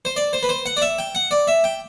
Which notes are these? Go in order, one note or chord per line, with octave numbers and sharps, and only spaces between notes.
C5
D5
C5
B4
C5
F#5
D5
E5
G5
F#5
D5
E5
G5